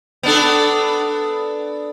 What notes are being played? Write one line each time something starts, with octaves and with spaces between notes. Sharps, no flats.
B3 D4 A4